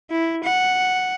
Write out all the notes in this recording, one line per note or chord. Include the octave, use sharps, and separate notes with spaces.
E4
F#5